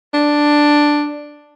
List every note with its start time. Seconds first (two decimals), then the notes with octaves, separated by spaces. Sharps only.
0.14 D4